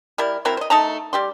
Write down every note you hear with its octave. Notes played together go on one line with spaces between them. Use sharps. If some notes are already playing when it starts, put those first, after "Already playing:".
G3 E4 A#4
F#3 C4 E4 A#4
C5 D#5
A3 D#4 A5 A#5
G3 G4 C6